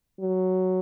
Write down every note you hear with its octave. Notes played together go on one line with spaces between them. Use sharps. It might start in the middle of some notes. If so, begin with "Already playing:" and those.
F#3